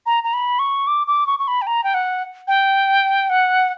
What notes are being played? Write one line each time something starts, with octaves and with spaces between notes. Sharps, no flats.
A#5
A#5
B5
C#6
D6
D6
C#6
C#6
B5
G5
A#5
G5
F#5
G5
F#5